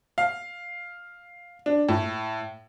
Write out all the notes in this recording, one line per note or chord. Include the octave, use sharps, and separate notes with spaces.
F5
D4
A2